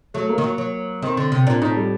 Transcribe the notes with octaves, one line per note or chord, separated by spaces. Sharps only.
F#3 A3
A#3
D#3
F#3
F#3
D#3 C4
D3
C3
A#2 D4
A2 D#4
G3